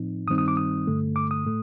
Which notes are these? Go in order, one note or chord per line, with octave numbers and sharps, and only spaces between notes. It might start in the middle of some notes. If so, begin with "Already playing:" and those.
Already playing: A2 F3 C4 D#4
G2 D#3 G3 C4 D#4 D#6
D#6
D6
D#6
G2 D3 A3
D6
D#6
A2 A3